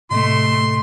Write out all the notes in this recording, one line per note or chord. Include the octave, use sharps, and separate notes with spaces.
A2 C3 A3 D#5 C6